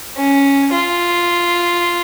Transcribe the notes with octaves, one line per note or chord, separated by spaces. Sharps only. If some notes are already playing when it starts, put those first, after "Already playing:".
C#4
F4